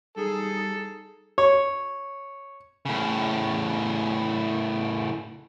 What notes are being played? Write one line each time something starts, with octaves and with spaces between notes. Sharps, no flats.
G3 D#4 G#4 A4
C#5
A2 C#3